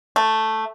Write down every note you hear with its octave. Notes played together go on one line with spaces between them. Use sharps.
A3